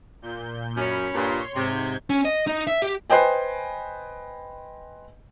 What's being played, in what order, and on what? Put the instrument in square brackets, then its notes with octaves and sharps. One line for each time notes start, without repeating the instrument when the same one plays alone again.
[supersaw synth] A#2 G6
[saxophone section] F#2 C#4 [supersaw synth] B5
[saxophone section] G2 A#2 [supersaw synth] C#5 C6
[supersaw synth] G#2 G6 G#6 [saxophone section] C3
[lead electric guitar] C#4
D#5
D#4
E5
G4
[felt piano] B4 C5 D#5 G5 G#5